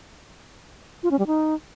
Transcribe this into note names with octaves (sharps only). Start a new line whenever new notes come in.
F4
C#4
G3
D#4